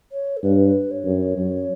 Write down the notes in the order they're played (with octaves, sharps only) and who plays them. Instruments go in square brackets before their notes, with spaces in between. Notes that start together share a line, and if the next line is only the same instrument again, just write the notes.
[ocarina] C#5
A4
[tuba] G2 [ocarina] B4
[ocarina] C#5
[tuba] F#2
F#2